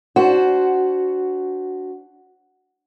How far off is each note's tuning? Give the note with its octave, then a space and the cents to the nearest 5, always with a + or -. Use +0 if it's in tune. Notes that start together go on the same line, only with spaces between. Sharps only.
D4 -15 F#4 +5 C5 +0